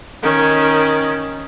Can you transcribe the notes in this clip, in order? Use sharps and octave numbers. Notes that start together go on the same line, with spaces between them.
D#3 C#4